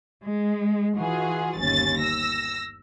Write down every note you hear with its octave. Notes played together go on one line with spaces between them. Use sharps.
G#3
E3 F4 F#4 G#4
G1 D#2 C#4 A6
E6 A#6